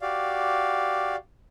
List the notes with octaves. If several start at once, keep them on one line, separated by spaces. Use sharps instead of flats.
F#4 G4 D5 F5